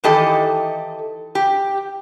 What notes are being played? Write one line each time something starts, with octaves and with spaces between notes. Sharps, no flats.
D#3 E3 G4 A4 D#5
G4